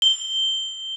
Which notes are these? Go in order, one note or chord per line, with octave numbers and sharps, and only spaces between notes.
G7